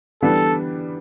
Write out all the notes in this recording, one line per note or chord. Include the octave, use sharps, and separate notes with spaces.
E3 G3 B3 D4 A4